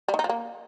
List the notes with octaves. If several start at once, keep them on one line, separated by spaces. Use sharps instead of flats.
G3
D#3
D#4
F3
A#3